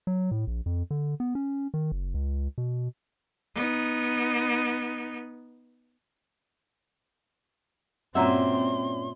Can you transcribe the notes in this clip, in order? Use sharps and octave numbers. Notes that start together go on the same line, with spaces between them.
F#3
A2
A#1
F2
D3
B3
C#4
D#3
F#1
C#2
B2
B3 D#4
G2 A#2 C4 C#4 F#4 E5 C6